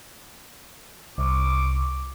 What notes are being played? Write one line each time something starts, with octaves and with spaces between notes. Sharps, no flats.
C2 C#6 D6